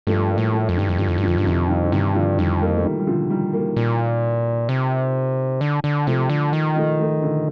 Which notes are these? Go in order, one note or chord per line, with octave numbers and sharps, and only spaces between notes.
G2 F3 A3
G3 A#3
A2
F3 A3
F2
G2 D#3 G3
F2
G2 D3 F3
F2
G2
F2 D3 F3
G2 F3
F2 C3 D#3
D#3 G3
D3
G2 C3 D#3
D3 F3
F2 D#3 G3
G3 A#3
A3
D#3 G3
G3
D3 F3
D#3 G3
G3 A#3
A#2
C3
D3
D3
C3 F3 A3
D3
D#3
F3 A3
F3 A3
D3 F3